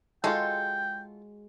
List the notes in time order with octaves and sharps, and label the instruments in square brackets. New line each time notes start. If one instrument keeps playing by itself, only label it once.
[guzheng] G#3 F#4 C#5 [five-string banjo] F4 A4 [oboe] G5